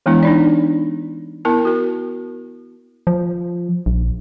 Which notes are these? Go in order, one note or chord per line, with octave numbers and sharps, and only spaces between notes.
E3 G#3 B3 D4 E4
D4 D#4 D5
B3 E4 A#4 A5
F#4 A#4
F3
A#1